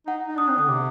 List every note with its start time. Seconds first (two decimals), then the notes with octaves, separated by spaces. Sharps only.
0.07 D#4 F#5
0.28 D#4
0.37 D4 D#6
0.48 C4 F#6
0.58 D3 D#6
0.69 C3 D6